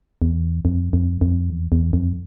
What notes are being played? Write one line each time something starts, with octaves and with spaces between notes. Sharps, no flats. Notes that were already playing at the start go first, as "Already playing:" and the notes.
E2
F2
F2
F2
E2
E2
F2